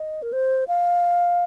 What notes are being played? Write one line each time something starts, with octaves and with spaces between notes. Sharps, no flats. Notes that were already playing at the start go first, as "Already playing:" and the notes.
Already playing: D#5
A#4
C5
F5